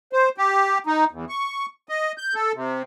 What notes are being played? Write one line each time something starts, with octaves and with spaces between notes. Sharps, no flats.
C5
G4
D#4
E2
C#6
D#5
G6
A4
C3